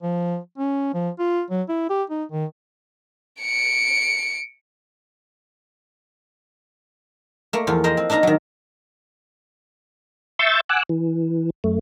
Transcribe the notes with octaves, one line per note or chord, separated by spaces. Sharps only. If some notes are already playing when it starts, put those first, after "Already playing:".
F3
C#4
F3
F4
F#3
E4
G4
D#4
D#3
C#7 D7
A3 A#3
E2 F3 F4
A#4 C5 D#5 F5
C4
D4 D#4 D#5 F5 A#5
D#3 F#3
E5 C6 C#6 E6 G6 A6
F#5 G#5 D6 E6 F#6
E3
F#2 A3